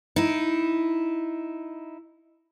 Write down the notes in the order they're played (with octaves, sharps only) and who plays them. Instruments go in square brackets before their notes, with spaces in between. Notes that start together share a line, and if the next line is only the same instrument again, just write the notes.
[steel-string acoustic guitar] D#4 E4